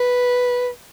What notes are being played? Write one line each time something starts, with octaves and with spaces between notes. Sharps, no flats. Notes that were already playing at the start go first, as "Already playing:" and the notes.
Already playing: B4